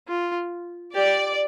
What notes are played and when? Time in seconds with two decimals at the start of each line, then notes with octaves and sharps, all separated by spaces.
0.08 F4
0.95 G4 D5